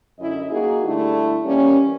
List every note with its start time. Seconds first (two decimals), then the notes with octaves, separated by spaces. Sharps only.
0.20 F#2 D3 E4 D#5
0.51 A#3 D#4 F4 F#4 G#4
0.85 D3 G3 A3 E4
1.45 E3 G3 A#3 C#4